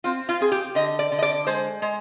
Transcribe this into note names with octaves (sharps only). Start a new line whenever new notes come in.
C4 F4
F4
C4 G#4
G4
D3 D#5
D5
D3
D#5
D5
G#3 C5
G#3